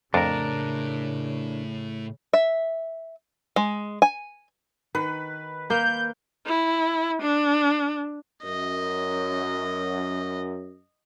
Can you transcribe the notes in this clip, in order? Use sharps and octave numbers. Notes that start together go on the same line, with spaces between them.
F2 A2 C#3 D4 A#4
E5
G#3
G#5
D#3 B4
A#3 A#4 G6
E4
D4
F#2 D#5